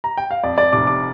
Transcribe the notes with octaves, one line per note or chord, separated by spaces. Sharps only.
A#5
G5
F5
F2 D5
D5
F1 D6
D6